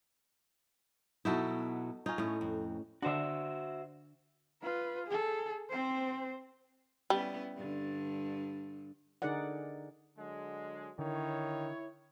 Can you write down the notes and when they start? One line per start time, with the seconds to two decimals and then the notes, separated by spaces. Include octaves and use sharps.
1.25 B2 F#3 D#4 E4 F#4 A4
2.06 C#4 D#4 F4
2.18 A2 A3 C#4
2.41 F2
3.02 D3 D4 F#4 C5 E5
4.63 F4 B4
5.07 G#4 A4
5.70 C4 C5
7.10 G3 B3 C#4 E4
7.56 G2 D3
9.22 D3 D#4 G#4 A#4 D5 F#5
10.17 D3 F#3 G#3
10.99 D3 D#3 E4 C#5